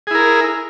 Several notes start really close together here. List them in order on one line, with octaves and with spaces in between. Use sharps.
G#4 E4 A#4